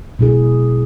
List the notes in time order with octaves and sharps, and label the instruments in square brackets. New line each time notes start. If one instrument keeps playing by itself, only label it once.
[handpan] B2 G#3 E4 G#4